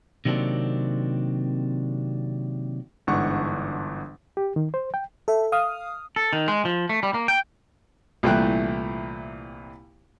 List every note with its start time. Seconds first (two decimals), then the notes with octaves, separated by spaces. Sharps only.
0.25 C3 D#3 F#3 A#3 C4 D4
3.07 G1 G#2 E3 D4 F#5 C#6
4.37 G4
4.56 D#3
4.74 C5
4.94 G5
5.28 A4 E5
5.52 F5 D#6 F6
6.16 A4
6.33 D#3
6.48 G#3
6.65 F3
6.89 A3
7.03 G3
7.14 A#3
7.28 G5
8.23 C2 A#2 E3 A3 G5 F#6